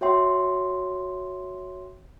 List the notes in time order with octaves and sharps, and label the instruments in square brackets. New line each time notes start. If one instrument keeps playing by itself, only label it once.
[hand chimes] F#4 C#5 E5 G5 C6